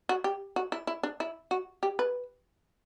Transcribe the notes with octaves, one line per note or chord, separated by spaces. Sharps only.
F#4
G4
F#4
E4
E4
D4
E4
F#4
G4
B4